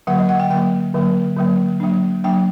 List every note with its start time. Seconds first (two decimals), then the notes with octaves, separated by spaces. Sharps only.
0.07 D3 F#3 A#3 F#5
0.19 D#5
0.29 F#5
0.40 G5
0.50 D3 F#3 A#3 G5
0.94 D3 F#3 A#3
1.37 D3 F#3 A#3
1.80 F#3 A#3 D4
2.24 F#3 A#3 D4 G5